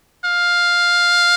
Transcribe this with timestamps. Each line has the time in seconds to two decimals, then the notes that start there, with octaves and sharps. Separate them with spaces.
0.25 F5